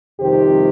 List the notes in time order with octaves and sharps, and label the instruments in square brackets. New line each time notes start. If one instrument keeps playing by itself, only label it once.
[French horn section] F2 C3 D#3 G3 G4 C5